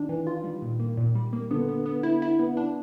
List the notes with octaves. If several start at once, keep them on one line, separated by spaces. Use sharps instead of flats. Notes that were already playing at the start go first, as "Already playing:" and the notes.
Already playing: D#3 D4
E3
F4
G3
A#2
A#3
A#2
G3
A#3
D3 B3
B3
B3
E4
E4
B3
D4